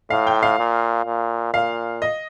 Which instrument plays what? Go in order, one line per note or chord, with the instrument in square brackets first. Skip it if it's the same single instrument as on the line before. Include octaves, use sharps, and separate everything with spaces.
[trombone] A2 [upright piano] F5
[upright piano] G5
F5
[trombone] A#2
A#2
[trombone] A#2 [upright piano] F5
[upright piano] D#5